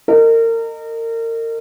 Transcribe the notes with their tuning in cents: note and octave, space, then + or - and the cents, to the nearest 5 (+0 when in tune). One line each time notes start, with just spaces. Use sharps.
A#4 -30 D#5 -15